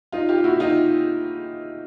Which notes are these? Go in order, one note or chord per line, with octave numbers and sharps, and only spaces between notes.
D#4 F4
F4 G4
E4 F#4
D#4 F4